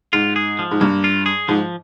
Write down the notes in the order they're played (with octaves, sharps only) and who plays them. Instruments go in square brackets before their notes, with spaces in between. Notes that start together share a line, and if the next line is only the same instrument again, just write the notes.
[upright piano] G#2 [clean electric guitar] F4
[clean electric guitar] G#4
F3
[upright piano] G#2
[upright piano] G2 [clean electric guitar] A#3
[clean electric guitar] F4
G#4
[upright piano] G#2 [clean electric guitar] F3